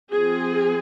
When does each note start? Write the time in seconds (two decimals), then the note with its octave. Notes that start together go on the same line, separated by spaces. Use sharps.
0.12 F3 C4 G#4